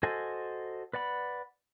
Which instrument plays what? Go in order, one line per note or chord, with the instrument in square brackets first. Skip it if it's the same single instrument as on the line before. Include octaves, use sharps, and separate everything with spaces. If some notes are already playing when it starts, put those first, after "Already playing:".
[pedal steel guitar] F#4 A4 C5 D#5 G#5
B4 D5 F#5 B5